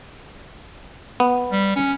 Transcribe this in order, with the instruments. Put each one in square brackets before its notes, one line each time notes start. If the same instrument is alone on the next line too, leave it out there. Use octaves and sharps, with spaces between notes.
[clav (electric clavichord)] B3
[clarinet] G3
C#4